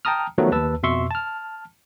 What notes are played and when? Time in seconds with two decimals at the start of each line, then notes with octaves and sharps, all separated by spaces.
0.05 G5 A5 A#5 D#6 F6
0.38 D#3 F3 F#3 A3 B3
0.51 D#2 B4 A5 E6
0.83 F2 B2 E5 C6 C#6 E6
1.11 A5 F6